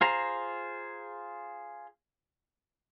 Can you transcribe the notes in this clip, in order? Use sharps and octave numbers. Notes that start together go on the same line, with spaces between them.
F4 G#4 C5 A#5